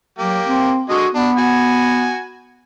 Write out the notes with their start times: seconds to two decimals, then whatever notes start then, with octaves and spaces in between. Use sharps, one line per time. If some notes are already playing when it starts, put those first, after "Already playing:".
0.19 F#3 A#3 G4
0.47 C4
0.89 D3 G#3 F#4 D#5
1.15 B3 D4
1.38 F#4 G#5